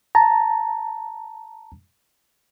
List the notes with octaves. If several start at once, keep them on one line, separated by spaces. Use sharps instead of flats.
A5 A#5